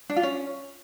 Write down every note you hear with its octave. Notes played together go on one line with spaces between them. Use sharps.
D4
F4
C#4